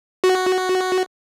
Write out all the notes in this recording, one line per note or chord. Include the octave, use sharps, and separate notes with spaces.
F#4